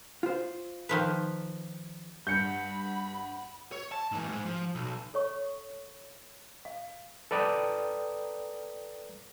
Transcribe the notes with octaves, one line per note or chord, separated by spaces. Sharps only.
F4 C5
D#3 F3 B4
G2 F#5 B5 G6 C#7
C#5
A5
G#2 E3
G#2 G#3
F3
B1
A4 C#5 C#6
F5
A4 B4 D5 G5 A#5 D#6